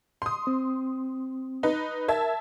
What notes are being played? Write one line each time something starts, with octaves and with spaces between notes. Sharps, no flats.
C6 D#6
C4
D#4 B4
A#4 E5 A5 G#6